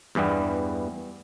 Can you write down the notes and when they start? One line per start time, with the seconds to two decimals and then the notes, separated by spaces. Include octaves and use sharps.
0.15 E2 G2 E3 G3 B3